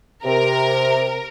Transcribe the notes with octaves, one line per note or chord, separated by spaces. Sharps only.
C3 A#4